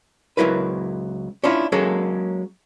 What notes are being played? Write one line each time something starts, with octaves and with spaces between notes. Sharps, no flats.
C#2 A#2 F#3 E4 A#4 B4
C#4 D4 E4 F4
F#3 G#3 A#3 C#4 G#4 A4